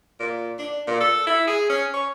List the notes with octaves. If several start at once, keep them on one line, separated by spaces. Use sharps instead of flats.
A#2
D4
A#2
A4
E4
G#4
C#4
C#5